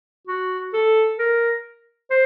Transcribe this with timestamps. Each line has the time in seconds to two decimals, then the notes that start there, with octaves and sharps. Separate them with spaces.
0.27 F#4
0.73 A4
1.19 A#4
2.11 C5